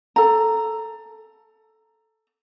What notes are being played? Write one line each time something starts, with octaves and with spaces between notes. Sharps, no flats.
A4 A#5